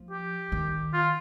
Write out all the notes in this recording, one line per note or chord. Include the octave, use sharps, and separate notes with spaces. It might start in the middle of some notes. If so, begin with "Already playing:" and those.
Already playing: F3
G4
D#3
F4